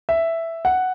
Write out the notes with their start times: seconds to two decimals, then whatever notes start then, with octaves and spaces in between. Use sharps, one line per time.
0.09 E5
0.65 F#5